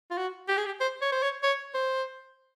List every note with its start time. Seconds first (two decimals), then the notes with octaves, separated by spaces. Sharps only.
0.11 F4
0.18 F#4
0.49 G4
0.58 G#4
0.66 G4
0.81 C5
1.02 C#5
1.12 C5
1.23 C#5
1.43 C#5
1.74 C5